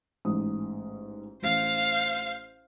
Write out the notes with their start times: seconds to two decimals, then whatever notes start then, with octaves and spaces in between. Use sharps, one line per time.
0.25 A1 G#2 D#6
1.42 A1 C5 F5